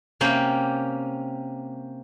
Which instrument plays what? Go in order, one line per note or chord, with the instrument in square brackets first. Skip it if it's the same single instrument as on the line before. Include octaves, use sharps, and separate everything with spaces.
[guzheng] C3 A#3 C#4 G4